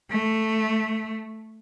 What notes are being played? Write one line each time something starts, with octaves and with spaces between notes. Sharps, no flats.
A3